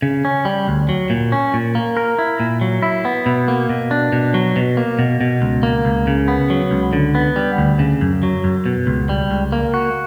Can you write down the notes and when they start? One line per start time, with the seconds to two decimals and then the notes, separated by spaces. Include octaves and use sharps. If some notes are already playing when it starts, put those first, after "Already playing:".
0.02 C#3
0.25 C#4
0.45 G3
0.68 D2
0.89 F#3
1.10 A#2
1.32 C#4
1.54 A#2
1.75 A#3
1.97 A#4
2.19 E4
2.40 A#2
2.61 F#3
2.82 E4
3.05 B3
3.26 B2
3.48 A#3
3.70 B2
3.91 D4
4.12 B2
4.34 F#3
4.56 B2
4.77 A#3
4.99 B2
5.21 B2
5.42 C#2
5.63 A#3
5.85 C#2
6.07 C#3
6.28 B3
6.50 F#3
6.71 C#2
6.93 D3
7.15 B3
7.36 G3
7.58 D2
7.79 C#3
8.01 F#2
8.23 F#3
8.44 F#2
8.66 B2
8.87 C#2
9.09 G3
9.30 C#2
9.52 A#3
9.74 F#4